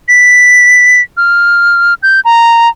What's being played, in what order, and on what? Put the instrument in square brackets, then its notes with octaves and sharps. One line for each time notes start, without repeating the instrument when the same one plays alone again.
[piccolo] B6
F6
G6
A#5